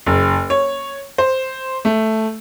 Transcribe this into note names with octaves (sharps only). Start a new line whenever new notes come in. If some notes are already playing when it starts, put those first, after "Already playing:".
F#1
C#5
C5
A3